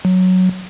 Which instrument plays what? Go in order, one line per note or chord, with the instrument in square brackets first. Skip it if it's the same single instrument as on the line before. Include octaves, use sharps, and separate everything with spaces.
[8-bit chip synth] F#3